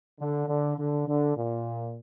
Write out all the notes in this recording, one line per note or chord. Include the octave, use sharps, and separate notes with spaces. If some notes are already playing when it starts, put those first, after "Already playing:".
D3
D3
D3
D3
A#2